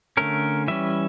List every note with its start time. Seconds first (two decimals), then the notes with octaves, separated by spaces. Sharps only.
0.17 D3 A3 C#4 A#4
0.68 E3 G3 C#4 E5